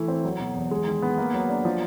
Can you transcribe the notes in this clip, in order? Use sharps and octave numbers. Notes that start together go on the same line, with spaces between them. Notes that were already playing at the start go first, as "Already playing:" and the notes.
Already playing: E3 A3
C4
F#3
B2
E2
G#3
D#3
B3
A#3
F#3
D4
F3